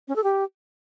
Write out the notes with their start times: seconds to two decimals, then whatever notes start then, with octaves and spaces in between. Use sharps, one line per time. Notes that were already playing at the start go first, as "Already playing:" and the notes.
0.08 C#4
0.16 A4
0.24 G4